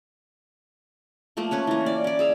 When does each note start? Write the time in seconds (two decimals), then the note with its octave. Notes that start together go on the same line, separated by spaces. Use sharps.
1.37 F3 A3 A#3
1.51 C#4 B4 C#5
1.67 E3 A#3
1.86 D5
2.04 C#4 D5
2.19 G#4 E5 F5